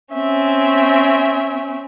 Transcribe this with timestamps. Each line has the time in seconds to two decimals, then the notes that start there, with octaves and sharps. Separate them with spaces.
0.13 C4 C#4 E5